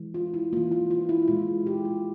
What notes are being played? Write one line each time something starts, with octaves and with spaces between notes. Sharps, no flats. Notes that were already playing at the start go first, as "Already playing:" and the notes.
Already playing: E3 G#3
F4
E4
E3 A#3 F4
F4
F4
E4
A#2 G#3 F4
G4
F4